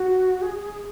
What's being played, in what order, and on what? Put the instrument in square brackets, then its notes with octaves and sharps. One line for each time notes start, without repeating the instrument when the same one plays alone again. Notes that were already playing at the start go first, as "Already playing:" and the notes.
Already playing: [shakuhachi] F#4
G#4